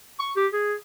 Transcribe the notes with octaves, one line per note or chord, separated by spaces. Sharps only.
C#6
G4
G#4